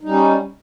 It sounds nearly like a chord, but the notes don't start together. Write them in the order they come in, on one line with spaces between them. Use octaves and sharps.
D#4 G3 C#4